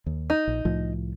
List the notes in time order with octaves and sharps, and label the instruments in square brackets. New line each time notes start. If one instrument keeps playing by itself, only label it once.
[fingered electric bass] D#2
[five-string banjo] D#4
[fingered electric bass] A#1
C2 A2 F3